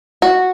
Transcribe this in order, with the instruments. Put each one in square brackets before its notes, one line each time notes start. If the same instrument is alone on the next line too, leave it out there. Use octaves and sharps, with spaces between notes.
[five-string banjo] F#4